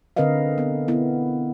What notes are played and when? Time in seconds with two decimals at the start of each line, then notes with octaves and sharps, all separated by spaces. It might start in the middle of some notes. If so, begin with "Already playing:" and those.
0.16 D3 C4 A#4 B4 D#5 F5
0.58 B3
0.88 B3 E4